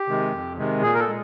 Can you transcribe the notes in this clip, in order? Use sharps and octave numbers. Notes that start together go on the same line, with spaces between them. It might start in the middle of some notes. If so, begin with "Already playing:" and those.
Already playing: G4
C3 D#3 G#3
F2
C3 D#3 G#3
A#2 G#4
A#4
A4
G#3